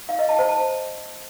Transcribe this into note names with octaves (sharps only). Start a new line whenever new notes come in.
F5
D#5
A5
C5
A5